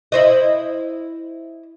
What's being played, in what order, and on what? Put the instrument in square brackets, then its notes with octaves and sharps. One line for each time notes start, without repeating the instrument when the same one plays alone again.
[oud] E4 C5 D#5